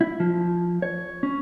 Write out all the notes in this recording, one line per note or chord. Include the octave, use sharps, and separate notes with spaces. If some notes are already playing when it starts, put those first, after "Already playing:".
E4
F3
C#5
C#4